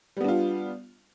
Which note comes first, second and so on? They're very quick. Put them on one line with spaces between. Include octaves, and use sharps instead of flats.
G3 B3 D4 F4